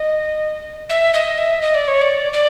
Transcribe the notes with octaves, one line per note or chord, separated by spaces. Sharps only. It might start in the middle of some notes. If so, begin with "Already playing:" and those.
Already playing: D#5
E5
D#5
E5
D#5
D5
C#5
D5
D5